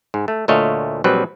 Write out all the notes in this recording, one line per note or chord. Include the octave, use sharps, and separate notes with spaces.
G#2
A3
D2 A#2 A3 C#5 D#5 F5
A#1 F#3 G3 C4 B4